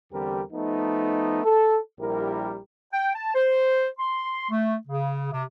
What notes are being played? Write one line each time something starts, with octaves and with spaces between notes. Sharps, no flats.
E2 D3 G3 C4 G4 A#4
F3 A3 B3 D#4
A4
A#1 G3 E4 G4 A#4
G5
A5
C5
C6
A3
C#3
C3